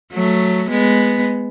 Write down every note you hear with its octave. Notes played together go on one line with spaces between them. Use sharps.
F#3 A3
G#3 B3